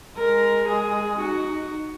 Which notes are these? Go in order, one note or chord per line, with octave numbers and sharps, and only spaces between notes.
G#3 A#4
G#4
D#4 F#4